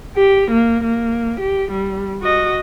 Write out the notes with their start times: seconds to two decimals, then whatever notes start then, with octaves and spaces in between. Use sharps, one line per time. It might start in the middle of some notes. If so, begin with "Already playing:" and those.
0.17 G4
0.51 A#3
0.84 A#3
1.40 G4
1.72 G3
2.21 F#4 D#5